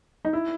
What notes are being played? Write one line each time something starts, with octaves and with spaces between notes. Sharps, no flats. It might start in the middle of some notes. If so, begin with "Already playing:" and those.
D#4
E4